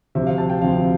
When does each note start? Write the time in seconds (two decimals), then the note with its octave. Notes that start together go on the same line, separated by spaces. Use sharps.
0.15 D2 C3 F3 C4 E5
0.27 F5
0.38 A5
0.50 G5
0.61 D2 C3 F3 C4 F5